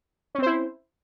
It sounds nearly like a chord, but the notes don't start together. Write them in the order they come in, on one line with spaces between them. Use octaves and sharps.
C#4 C4 C5 E4